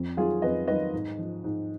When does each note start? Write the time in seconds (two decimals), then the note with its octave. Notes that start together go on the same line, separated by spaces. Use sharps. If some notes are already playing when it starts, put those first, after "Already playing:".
Already playing: F2
0.17 D#3 F#3 F4 G#4
0.42 F2 B4 D#5
0.67 D#3 F#3 B4 D#5
0.93 G#2
1.18 F3
1.44 G#2